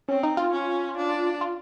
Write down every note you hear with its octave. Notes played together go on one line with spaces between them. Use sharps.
C4 C#4
D#4
F4
C#4
D4
F4